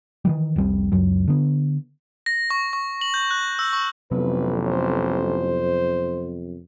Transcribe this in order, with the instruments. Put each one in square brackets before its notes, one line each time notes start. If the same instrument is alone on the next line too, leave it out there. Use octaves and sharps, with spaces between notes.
[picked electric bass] D#3 E3 G3
F1 C2 G3 C4
C#2 F#2 F#3
D3 B3
[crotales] A#6
C#6
C#6
F#7
G6
F#6
E6
C#6
[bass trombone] A1 [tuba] F2 [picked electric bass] C3 F#3 B3 [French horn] B4
[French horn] C5